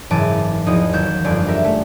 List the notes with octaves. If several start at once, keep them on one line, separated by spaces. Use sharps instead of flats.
F#1 G#2 E3 A5 D6 D#7
E2 F3 D#4 D#5
D#2 F#3 G6 E7
G1 F2 A#3 D5
G4 A#4 E5
A3